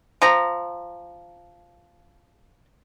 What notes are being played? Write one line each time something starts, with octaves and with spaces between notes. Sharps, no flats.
F3 A#5